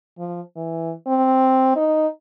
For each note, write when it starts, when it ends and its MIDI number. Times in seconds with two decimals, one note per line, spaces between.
0.18 0.41 53
0.56 0.92 52
1.07 1.75 60
1.76 2.07 63